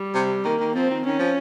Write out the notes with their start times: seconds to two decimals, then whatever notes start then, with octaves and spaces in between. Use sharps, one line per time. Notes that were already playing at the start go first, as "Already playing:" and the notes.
Already playing: G3
0.14 C3
0.45 D#3 A#3
0.60 D#3
0.76 F3 C4
0.91 D#3
1.05 D#3 C#4
1.19 F3